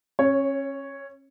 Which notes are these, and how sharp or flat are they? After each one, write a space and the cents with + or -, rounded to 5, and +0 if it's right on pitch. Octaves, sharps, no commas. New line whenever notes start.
C#4 -30 C#5 +0